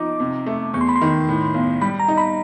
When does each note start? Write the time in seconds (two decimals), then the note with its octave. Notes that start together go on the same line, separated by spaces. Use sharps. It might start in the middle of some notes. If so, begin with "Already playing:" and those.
Already playing: F3 D#4 D6
0.20 C3
0.46 A3
0.74 E2 C#6
0.81 C6
0.89 B5
0.96 C6
1.01 D#3
1.29 A2
1.54 B1
1.81 G3 B5
2.00 A#5
2.08 D#4
2.17 B5